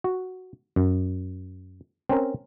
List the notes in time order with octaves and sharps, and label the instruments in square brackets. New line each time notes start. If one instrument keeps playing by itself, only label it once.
[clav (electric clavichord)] F#4
F#2
C4 C#4 A#4